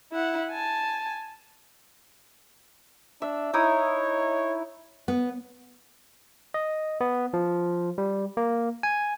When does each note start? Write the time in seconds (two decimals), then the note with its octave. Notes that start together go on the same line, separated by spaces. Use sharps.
0.12 E4 F#5
0.51 G#5 A5
3.22 D4 E5
3.54 D#4 E4 C#5 D#6
5.08 B3
6.54 D#5
7.01 B3
7.34 F3
7.98 G3
8.37 A#3
8.83 G#5